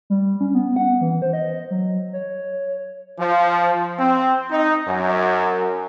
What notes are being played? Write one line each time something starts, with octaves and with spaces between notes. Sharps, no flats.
G3
C#4
B3
F#5
E3
C5
D#5
F#3
C#5
F3
C4
D#4
F#2